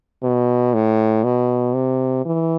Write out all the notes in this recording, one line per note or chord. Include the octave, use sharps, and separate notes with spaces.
B2
A2
B2
C3
E3